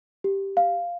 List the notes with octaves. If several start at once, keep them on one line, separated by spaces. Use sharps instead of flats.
G4
F5